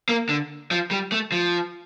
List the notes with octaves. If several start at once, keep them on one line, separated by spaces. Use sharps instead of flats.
A#3
D3
F3
G3
A3
F3